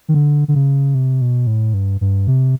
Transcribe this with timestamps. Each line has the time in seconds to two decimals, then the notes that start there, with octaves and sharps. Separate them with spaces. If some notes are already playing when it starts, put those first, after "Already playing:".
0.09 D#3
0.14 D3
0.48 D3
0.55 C#3
0.95 C3
1.21 B2
1.47 A2
1.74 G2
2.01 G2
2.27 C3